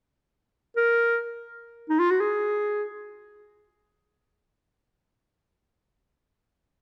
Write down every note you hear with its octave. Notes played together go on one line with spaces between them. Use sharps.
A#4
D#4
F4
F#4
G#4